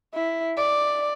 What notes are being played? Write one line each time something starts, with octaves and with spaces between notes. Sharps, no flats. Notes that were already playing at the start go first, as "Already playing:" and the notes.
E4
D5